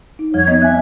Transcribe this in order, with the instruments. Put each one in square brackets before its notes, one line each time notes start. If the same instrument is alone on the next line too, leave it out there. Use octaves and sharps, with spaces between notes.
[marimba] D#4
[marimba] F2 F3 G3 [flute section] C#5 G#6
[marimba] B3 C4 D#5
[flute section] E5 [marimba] G#5 F#6